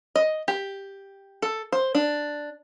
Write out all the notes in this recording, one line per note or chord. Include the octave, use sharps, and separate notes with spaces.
D#5
G4
A4
C5
D4